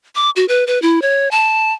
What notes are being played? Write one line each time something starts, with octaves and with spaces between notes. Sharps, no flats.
D6
F#4
B4
B4
E4
C#5
A5